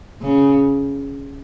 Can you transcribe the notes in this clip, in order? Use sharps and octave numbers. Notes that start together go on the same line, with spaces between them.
C#3